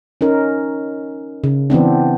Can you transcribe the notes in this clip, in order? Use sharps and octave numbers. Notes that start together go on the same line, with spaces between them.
C#4 D#4 A#4
C#3
E3 B3 C4 D4